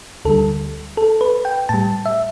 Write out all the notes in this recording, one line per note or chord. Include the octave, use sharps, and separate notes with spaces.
D2 D3 G3 A4
A4
B4
G5
A2 G3 A5
E5